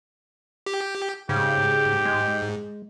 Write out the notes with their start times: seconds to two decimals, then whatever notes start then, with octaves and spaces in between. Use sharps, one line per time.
0.66 G4
1.29 G#2 C#3 G4
2.05 G#3